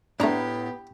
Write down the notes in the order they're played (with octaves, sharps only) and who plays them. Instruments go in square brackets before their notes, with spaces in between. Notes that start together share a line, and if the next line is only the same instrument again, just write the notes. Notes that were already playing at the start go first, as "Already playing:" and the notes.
[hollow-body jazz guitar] A2 A#5 [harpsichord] A3 D4 [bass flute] B3 [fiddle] G4